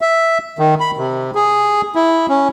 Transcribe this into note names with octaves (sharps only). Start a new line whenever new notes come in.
E5
D#3
B5
C3
G#4
E4
C#4